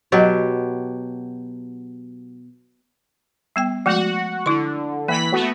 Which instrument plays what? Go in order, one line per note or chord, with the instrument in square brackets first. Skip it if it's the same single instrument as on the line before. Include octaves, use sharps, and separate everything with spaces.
[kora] B2 F#3 G4
[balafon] G3 B3 G5
[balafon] F3 G#3 A3 [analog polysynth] F#4 F#5
[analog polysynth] D3 [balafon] E4 C6
[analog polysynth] E3 B5 B6 [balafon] A#3
[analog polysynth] A3 B3 F#4